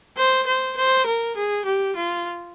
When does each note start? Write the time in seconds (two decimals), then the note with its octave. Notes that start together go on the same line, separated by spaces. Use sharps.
0.18 C5
0.47 C5
0.77 C5
1.06 A#4
1.37 G#4
1.66 G4
1.96 F4